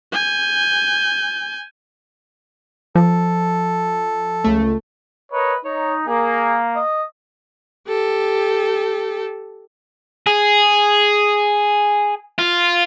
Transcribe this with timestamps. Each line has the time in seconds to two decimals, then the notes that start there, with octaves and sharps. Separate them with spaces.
0.12 G#5 G6
2.96 F3 A4
4.44 C#2 A3
5.33 A#4 B4 C#5 D#5
5.65 D#4 C#5
6.07 A#3 G#4
6.76 D#5
7.88 G4 A4
10.27 G#4
12.39 F4